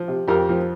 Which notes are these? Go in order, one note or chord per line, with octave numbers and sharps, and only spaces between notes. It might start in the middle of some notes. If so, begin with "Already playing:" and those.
Already playing: F3
C3
F2 G4 A#4
F3